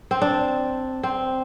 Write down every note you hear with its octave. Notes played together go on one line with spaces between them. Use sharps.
C4
D4
C4